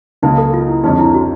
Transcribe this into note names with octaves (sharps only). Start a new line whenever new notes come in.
C#2 C#3 F#3 A#3 D#4
A4
F4
E4
F2 D3 F3 G#3 C#4 D#4
E4
F#4